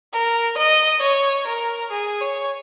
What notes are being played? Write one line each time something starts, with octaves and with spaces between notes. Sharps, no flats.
A#4
D#5
C#5
A#4
G#4
C#5